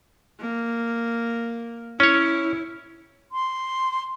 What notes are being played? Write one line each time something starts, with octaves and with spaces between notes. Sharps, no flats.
A#3
C#4 E4 C#5
C6